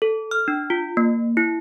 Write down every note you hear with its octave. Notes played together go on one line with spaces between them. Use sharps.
A4
F6
D4
F4
A#3
E4